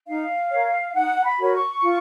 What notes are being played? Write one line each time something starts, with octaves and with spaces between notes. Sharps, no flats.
D#4 F5
A#4 C#5
D#4 F#5
B5
F#4 A#4 C#5 B5
C#6
F4